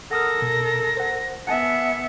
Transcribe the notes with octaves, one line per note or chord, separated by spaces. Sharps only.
A4 A#4 F#5 D#6 F6 A#6
B2
C5 F#5
B3 E5 F#5 G#5 A5 C#7